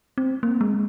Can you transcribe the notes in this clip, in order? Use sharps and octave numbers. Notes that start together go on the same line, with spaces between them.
C4
A#3
G#3